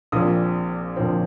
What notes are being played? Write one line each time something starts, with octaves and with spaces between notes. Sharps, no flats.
A#1 A#2 F3 C4 D#6
A#1 A#2 F3 C4